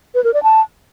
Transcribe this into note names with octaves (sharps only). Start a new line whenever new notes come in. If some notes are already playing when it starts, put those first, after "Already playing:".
B4
A#4
D5
A5